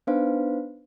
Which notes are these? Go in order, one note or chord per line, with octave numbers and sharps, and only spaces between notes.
B3 D4 D#4 B4 C5 F5